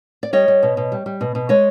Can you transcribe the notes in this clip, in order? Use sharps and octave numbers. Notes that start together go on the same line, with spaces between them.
D5
G3 C#5 D#5
G3
B2
B2
G3
G3
B2
B2
G#3 C#5 D#5